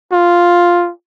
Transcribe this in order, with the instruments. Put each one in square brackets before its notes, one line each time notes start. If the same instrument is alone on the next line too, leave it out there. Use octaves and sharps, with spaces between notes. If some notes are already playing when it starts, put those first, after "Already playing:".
[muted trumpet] F4